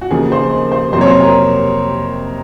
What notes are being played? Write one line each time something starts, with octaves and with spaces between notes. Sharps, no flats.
F#4
D#2 C#3 F3 A#3 G#4
C5
C5
F2 C3 F#3 A#3 C5
C#5
C5
A#4